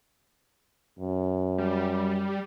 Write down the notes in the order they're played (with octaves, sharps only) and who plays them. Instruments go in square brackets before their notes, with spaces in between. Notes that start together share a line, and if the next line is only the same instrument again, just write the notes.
[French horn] F#2
[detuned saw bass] G3